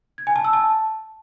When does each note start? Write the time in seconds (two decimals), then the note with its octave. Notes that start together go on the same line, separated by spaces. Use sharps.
0.18 G#6
0.27 G#5
0.36 A5
0.45 E6
0.53 A5